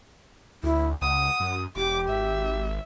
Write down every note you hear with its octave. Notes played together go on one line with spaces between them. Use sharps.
D2 E4
C#2 F#5 D#6
F#2
E1 G4 D6
G#1 E5